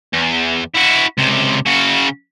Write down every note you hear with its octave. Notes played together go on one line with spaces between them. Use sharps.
E2
E4 F#4
C#2 C3
C#3 F#4